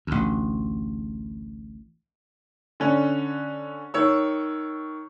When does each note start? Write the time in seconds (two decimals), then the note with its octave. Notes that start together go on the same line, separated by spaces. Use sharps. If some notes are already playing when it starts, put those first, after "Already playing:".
0.07 A1 D2
2.80 D3 C#4
3.94 D#3 C#5 E6